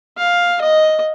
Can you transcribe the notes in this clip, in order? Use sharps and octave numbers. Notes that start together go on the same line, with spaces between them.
F5
D#5